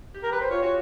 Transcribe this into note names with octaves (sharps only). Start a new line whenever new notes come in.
G4
A#4
G4 B4
C5
F4 C#5
F#4 C#5